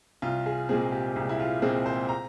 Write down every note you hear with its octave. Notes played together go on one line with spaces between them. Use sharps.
C2 F4
G#4
A#2 G#3 C4 G#4
G4
C2
E4
F4
A#2 G#3 C4 G#4
C5
A#5